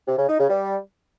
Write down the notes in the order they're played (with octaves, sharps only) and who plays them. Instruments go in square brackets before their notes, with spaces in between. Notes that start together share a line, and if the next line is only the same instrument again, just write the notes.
[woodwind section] C3
C#3
D#4
C#3
G3